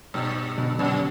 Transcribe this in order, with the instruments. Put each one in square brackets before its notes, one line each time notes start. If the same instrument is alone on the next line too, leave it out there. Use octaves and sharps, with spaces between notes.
[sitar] G2 [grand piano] B2
[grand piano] B2 D3
[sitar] F#2 [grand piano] B2 D3